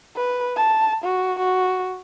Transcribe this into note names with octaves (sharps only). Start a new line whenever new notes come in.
B4
A5
F#4
F#4